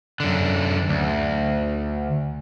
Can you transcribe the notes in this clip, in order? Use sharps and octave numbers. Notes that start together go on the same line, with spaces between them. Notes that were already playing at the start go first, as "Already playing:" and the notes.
F#2 D3
D2